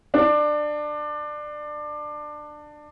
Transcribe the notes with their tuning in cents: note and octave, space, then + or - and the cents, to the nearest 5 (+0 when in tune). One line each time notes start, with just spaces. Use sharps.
D4 +20